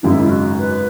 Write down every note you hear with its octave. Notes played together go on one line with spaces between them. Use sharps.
G#1 F#2 C#3 G#3 D#4 E4
E4
F#4
B4